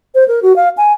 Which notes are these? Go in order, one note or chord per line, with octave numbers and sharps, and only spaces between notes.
C5
A#4
F#4
F5
G#5